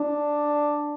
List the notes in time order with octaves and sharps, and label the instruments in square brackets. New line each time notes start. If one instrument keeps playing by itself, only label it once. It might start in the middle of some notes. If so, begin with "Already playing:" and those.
Already playing: [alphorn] D4